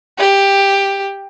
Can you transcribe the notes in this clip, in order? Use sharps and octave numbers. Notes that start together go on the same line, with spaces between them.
G4